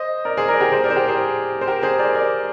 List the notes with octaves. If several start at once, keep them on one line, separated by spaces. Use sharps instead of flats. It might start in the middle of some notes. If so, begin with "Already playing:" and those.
Already playing: C5 D#5
A#4 D5
G#4 C5
A#4 D5
G4 A#4
G#4 C5
A#4 D5
C5
G4 A#4
G#4 C5
C5
G4 A#4
G#4 C5
A#4 D5
A#4 D5